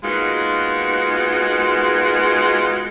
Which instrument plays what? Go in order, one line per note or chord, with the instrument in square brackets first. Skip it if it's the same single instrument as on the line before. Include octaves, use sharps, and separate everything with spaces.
[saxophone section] G#3 A#3 B3 D#4 F4 F#4